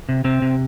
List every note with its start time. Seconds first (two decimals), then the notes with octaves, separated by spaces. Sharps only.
0.09 C3
0.24 C3 C4
0.42 C3